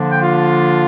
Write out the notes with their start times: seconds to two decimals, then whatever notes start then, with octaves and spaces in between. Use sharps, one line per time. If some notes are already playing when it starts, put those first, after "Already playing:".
Already playing: D3 F3 A#3 D4
0.11 G5
0.20 F4 F5